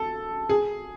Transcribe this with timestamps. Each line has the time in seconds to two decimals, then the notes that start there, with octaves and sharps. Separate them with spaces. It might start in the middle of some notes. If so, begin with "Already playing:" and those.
Already playing: A4
0.49 G#4